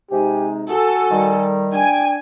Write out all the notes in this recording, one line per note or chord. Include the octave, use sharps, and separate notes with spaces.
C3 G#3 D#4 G4 G#5
F#4 A4 G#5
D#3 G3
D4 G5 G#5